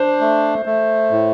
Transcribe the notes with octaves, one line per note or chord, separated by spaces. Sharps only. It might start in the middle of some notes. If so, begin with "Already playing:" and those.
Already playing: D4 C5
A3
A3
A2